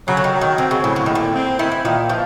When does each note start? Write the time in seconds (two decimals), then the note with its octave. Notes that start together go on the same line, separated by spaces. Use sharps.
0.07 C#3 F#3
0.17 D3
0.24 D#3
0.33 F#3
0.41 D#3
0.58 D3 C4
0.71 C#3
0.83 A2 C#3
0.96 D3
1.06 A#2 D#3
1.15 D3
1.34 C4
1.59 D#3 E4
1.72 E3
1.85 A#2 D#3
2.09 E3 F3